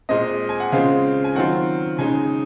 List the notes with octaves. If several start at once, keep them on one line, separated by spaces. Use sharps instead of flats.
A#2 G#3 C4 D#5
G#5
F#5
C#3 G#3 C4 F4 F5
G#5
D#3 F#3 C4 F4 F#5
C#3 G#3 D#4 G#5